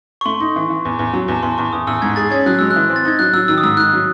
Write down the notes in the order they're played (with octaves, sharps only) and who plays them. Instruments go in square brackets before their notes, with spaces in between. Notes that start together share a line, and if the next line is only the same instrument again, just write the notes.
[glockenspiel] C#6
[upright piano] A3 [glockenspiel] C6
[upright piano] D#4
E3
E3
E2
E2
F#3
[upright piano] E2 [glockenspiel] A5
[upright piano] E2 [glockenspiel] C6
[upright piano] E2 [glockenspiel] C#6
[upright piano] E2 [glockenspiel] D#6
[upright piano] E2 [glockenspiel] E6
[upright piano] G#2 [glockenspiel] G#6
[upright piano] G#4 [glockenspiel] A6
[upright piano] C#4 [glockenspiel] G#6
[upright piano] F#3 [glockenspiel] F#6
[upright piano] G#3 [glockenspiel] E6
[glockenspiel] F#6
[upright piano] E3
C4
[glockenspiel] A6
[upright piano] D#4 [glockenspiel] G#6
[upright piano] F#3 [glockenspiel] F#6
[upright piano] F#3 [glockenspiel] E6
[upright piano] D#3 [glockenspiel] E6
[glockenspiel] D#6
[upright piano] G#2 [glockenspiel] E6
[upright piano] D#3 [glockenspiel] F#6
[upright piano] F#3